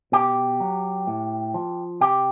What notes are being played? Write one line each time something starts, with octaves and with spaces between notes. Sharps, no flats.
B2 G4
F#3
A2
F3
C3 G4